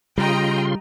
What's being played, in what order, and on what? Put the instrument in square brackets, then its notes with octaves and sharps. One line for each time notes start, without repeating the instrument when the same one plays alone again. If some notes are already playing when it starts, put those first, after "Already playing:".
[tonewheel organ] C#3 F4 C6 [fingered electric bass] G3 [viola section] D#5 G5 A#5